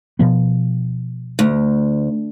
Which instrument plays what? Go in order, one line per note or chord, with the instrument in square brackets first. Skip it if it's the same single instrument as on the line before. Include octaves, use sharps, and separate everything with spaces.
[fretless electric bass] B2 F3 B3
[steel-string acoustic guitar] D2